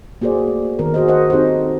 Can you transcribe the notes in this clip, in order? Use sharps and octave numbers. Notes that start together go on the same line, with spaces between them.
A#3 F#4 G#4 C5 D5
A3
D#3 B3 A#4
F#4 G#4 C5 D#5
A#4 C5 D#5 F#5
C4 D#4 G4 A4 C5